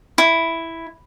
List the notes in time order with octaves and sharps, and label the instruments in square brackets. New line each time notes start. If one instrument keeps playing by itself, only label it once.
[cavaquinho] E4